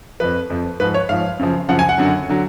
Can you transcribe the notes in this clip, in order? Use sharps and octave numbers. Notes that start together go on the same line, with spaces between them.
F2 F3 B4
F2 F3
G#2 F3 B4
C#5
G#2 F3 F5
F#2 C#3 F3
F#2 C#3 F3 F#5
G#5
F#5
F#2 D3 F#3
D3 F#3